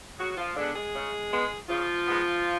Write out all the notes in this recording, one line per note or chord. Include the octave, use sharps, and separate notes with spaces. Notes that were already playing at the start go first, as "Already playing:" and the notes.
C#3 F#3 F#4
F3 F4
D3 G#3 B3 D4
G#3 G#4
C#3
G#3 B3
C#3 F3 F4
G#3 B3